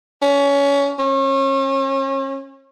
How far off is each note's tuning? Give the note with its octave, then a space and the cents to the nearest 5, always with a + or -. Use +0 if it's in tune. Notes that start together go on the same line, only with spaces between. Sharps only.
C#4 +25
C#4 -35